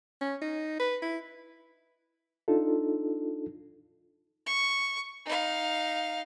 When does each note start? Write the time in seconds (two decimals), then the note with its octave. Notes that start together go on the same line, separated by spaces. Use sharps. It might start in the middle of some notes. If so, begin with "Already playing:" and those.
0.21 C#4
0.42 D#4
0.80 B4
1.02 E4
2.48 D4 D#4 F4 A4
4.46 C#6
5.25 D#4 F5